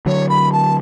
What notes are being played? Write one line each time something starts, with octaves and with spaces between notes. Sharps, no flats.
D3 F#3 C#5
B5
A5